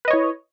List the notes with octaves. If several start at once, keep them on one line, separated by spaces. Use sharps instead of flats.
E4 B4 C#5 D#5